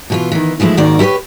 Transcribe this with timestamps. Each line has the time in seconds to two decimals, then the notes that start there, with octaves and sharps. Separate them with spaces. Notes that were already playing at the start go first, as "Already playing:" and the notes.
0.10 B2 E3 F4
0.32 D#3 E3
0.60 E3 F3 G#3 A3 E4
0.77 D#2 G#2 D#3 F#4 D5
0.99 E4 G4 A4 B4 C#5